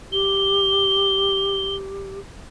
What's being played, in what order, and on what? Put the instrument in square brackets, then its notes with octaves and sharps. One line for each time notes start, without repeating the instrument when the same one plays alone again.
[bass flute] G4 [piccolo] G7